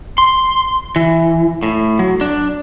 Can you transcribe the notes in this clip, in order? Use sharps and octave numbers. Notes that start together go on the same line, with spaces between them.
C6
E3
A2
F#3
D4